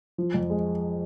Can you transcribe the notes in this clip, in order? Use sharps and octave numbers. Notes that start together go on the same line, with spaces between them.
F3
F2
G#3